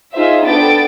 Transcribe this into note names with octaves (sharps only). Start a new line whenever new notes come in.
D#4 F4 G#4 C5 E5
B3 D4 A4 G5 A6 D7